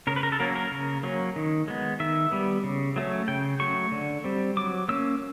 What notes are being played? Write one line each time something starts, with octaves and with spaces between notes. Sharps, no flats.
C#3 A#4
B4
A#4
A4
F#3 A#3 C#4 A#4
A#4
C#3
F#3 A#3 C#4
D#3
G#3 B3
D#3 E5
G3 B3
C#3
F#3 A3 C#4
C#3 G5
F#3 A3 C#6
D3
G3 C4
F#3 D6
A#3 C#4 E6